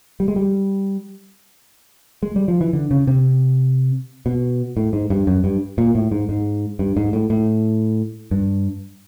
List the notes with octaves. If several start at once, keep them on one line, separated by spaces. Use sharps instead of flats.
G3
G#3
G3
G#3
G3
F3
E3
D3
C#3
C3
B2
A2
G#2
G2
F#2
G2
A#2
A2
G#2
G#2
G2
G#2
A2
A2
G2